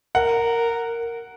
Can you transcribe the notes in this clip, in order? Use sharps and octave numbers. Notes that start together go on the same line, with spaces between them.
A#4 F#5